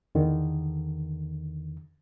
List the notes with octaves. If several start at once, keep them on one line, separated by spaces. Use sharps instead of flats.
E2 D3 D#3